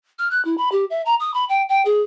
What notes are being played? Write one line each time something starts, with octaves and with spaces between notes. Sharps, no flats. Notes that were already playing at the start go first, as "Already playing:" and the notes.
F6
F#6
E4
B5
G4
E5
A#5
D#6
B5
G5
G5
G#4